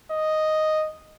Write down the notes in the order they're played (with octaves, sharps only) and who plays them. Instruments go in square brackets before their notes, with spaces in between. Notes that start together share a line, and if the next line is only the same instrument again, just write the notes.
[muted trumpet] D#5